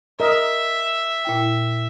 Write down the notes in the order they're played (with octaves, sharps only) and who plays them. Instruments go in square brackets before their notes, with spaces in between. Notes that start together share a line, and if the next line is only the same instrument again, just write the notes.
[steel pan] A#4 D#5 [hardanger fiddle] E5
[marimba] A#2 E4 G5